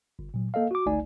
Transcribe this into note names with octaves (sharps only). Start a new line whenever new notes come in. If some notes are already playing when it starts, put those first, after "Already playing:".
G1
A#2 F#3
A#3 A4 D#5 F5
F#4 D6
G1 C#2 A3 D#4 D5 G#5